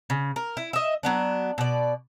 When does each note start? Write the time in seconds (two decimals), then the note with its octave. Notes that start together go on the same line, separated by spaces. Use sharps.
0.10 C#3
0.36 A#4
0.57 E4
0.73 D#5 E5
1.03 F#3 B3 D4
1.58 B2 D5